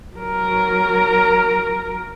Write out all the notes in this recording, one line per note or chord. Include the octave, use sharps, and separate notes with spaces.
F#3 A#4